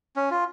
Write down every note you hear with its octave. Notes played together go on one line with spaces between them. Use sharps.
C#4
F4